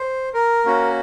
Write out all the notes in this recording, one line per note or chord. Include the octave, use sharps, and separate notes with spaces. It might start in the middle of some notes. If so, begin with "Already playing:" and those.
Already playing: C5
A#4
A#3 C#4 F#4